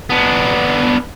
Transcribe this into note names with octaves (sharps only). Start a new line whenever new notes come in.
B3 D4